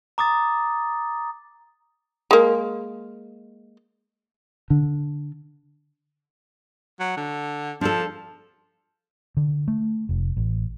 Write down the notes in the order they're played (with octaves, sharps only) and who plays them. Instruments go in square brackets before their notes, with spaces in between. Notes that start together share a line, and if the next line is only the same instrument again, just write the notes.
[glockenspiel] A#5 D6 D#6 A6
[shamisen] G#3 A#3
[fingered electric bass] D3
[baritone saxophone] F#3
D3
[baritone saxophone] F3 [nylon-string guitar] D4 A4
[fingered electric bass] D3
A3
F1
A1